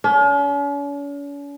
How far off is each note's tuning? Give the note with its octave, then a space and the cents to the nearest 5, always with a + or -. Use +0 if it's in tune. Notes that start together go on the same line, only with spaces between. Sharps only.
C#4 +45